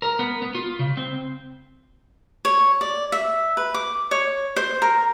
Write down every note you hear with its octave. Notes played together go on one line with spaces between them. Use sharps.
A#4
B3
B3
F4
C#3
C4
C#5
D5
E5
B4
D6
C#5
C5
A#4